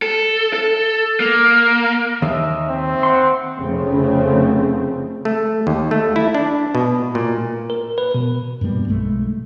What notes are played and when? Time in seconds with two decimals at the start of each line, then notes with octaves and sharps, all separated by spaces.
0.02 A4
0.53 A4
1.20 A#3
2.22 D#2 D#5 E5
2.69 C4
3.03 F#5 C6
3.56 F1 C#3 A3 C4
5.25 A3
5.67 D#2
5.91 A3
6.16 E4
6.35 D4
6.75 B2
7.15 A#2
7.70 A#4
7.98 B4
8.14 B2
8.61 G2 B2 G3 A#3
8.88 B1 G#3 A3